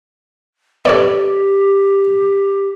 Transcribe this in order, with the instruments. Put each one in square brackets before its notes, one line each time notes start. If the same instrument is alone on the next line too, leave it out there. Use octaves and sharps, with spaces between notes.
[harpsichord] B3 D4 [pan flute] G4 [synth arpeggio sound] A4 C#5 D5